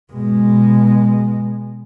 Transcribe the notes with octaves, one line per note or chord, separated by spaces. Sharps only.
B2 G#3